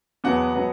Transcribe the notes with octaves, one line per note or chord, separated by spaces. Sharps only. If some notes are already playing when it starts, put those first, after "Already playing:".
E2 B2 F#3 B3 F#5
B2 F#3 B3